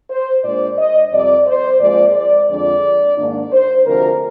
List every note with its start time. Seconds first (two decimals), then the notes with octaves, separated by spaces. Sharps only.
0.10 C5
0.44 A#2 G#3 D4 D5
0.78 D#5
1.12 F2 C3 G3 C4 D5
1.47 C5
1.80 A#2 F3 G#3 C4 D5
2.15 D5
2.49 F2 D3 F3 G#3 D4 D5
3.18 G#2 D#3 A#3 D4
3.51 C5
3.85 D2 C3 F3 G#3 A#4